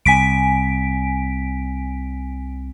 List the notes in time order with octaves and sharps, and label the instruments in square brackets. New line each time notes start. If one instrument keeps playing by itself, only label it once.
[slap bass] C2 [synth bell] G#5 B6 D7